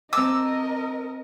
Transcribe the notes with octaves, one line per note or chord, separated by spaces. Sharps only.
C4 A#4 D#5 A5 D6 E6